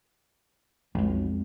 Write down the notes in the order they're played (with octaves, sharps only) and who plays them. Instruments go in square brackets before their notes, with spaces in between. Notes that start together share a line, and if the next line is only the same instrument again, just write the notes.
[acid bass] B1 [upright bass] F2 G#3